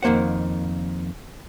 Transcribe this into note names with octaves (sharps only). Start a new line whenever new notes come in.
F2 D#3 A#3 C5 F#5